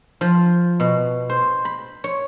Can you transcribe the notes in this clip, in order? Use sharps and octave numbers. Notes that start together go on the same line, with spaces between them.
F3
B2
C5
B5
C#5